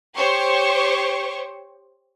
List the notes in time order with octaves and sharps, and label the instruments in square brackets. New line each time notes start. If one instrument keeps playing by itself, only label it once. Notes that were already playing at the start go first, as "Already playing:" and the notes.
[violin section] G4 C5 C#5 C#6